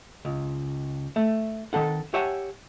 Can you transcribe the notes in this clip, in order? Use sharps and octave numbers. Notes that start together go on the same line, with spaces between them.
C#2
A3
D#3 C4 A4 F#5
G4 C#5 E5 F#5 G#5 A5